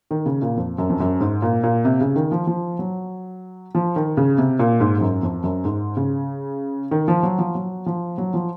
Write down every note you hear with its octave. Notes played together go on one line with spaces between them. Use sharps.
D#3
C#3
A#2
F2
F#2
F2
F#2
G#2
A#2
A#2
C3
C#3
D#3
F3
F3
F#3
F3
D#3
C#3
C3
A#2
G#2
G#2
F#2
F2
F#2
G#2
C#3
D#3
F3
F#3
F3
F#3
F3
F#3
F3